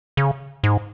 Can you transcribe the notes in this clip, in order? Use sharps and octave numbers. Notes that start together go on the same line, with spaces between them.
C#3
G#2